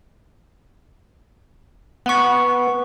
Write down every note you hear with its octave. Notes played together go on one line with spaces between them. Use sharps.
B3 F#5 C#6